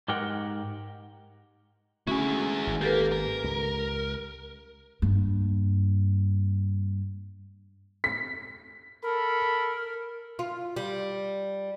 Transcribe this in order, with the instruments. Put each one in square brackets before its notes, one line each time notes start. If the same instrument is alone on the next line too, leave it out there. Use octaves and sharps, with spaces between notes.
[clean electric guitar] G#2 G4 A#4 F#5 G5
[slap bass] D3 A3 [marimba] C#4 F#4 [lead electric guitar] E4 G#4
[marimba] G#3
[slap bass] G#1
[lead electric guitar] A#3 [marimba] G4 A4 B4
[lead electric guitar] A#4
[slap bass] C#2
[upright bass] G2 A#3
[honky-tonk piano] B6
[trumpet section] A4 B5 [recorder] A#4
[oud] F4
G3